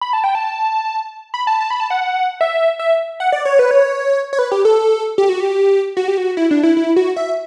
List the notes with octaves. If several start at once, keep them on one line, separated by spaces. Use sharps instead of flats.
B5
A5
G5
A5
B5
A5
A5
B5
A5
F#5
E5
E5
F#5
D5
C#5
B4
C#5
C#5
B4
G4
A4
G4
F#4
G4
F#4
G4
F#4
E4
D4
E4
E4
F#4
E5